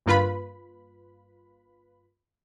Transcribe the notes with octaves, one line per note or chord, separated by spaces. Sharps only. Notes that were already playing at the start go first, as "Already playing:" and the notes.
G1 G2 A#3 F4 B4 B5